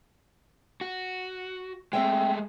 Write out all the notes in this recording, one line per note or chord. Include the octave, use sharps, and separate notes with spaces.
F#4
G#3 A3 C4 E5 G5